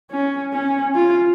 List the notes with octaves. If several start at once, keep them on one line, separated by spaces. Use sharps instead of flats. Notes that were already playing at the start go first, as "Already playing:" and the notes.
C#4
C#4
F4